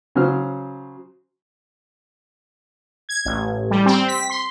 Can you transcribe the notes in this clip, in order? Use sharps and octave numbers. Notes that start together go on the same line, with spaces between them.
C#3 F#3 F#4 C5 F6
G#6
A1
G3
C4
B6
C6